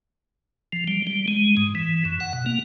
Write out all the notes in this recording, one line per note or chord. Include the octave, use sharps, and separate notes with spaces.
F3
G3
G3
G#3
G#2
E3
F#2
F#5
B2
A#3